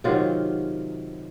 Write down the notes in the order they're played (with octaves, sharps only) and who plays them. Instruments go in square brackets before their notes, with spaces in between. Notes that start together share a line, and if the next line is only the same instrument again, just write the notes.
[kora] C3 D#3 F#3 F4